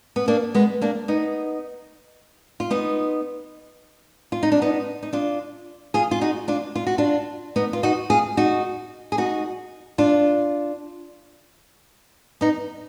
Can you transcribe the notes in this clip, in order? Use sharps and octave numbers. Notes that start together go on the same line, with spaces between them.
B3
A#3 D4
G#3 B3
A#3 D4
B3 D#4
F4
B3 D#4
F4
D#4
D4
B3 D#4
D#4
D4 F4
F4 G#4
F4
D#4 F#4
D4 F4
F4
F#4
D4 F4
B3 D#4
F4
D#4 F#4
F4 G#4
D#4 F#4
G#4
D#4 F#4
D4 F4
B3 D#4